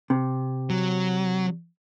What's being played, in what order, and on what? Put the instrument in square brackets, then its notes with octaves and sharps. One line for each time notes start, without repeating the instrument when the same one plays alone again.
[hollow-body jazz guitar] C3
[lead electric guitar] F#3